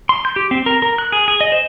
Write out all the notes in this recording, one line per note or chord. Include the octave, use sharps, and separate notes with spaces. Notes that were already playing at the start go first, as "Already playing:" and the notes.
C6
G6
G4
C4
A#4
A#4
F#6
G#4
G#4
D#5
C5